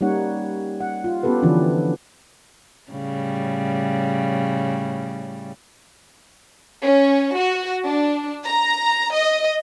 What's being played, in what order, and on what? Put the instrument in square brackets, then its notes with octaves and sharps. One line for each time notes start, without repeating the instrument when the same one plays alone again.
[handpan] G3 A#3 C#4 D#4 C#5 F#5
F#5
F4
B3 C#4 F#4 G4 A4 B4
D3 E3 F3 C#4 D4
[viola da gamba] A2 C#3 G3
[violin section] C#4
F#4
D4
A#5
D#5